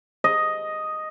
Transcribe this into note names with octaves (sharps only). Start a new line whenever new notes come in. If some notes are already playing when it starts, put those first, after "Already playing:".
D#5